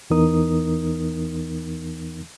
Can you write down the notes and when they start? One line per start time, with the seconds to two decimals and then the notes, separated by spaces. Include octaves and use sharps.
0.10 E2 E3 B3 D#4 A#4 D#6